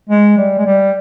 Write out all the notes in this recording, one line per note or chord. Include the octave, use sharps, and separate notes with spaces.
G#3
G3
G#3
G3